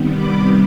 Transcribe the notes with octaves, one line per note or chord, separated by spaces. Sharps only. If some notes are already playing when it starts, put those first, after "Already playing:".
Already playing: C3 D#3 G3 B3
B5 D6